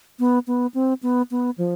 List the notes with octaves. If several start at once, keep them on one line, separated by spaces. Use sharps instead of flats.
B3
B3
C4
B3
B3
F3